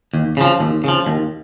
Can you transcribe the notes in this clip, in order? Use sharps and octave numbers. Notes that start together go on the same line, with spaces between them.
D#2
C#3 F3
D#2
C#3 F3
D#2